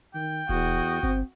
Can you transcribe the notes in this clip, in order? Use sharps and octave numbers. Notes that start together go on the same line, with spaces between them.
D#3 G5
D#1 E2 F#4 D#6
G1 C4